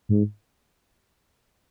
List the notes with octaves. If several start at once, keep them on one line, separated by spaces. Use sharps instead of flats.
G#2